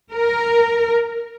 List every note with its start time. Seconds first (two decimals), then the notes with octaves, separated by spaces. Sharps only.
0.11 A#4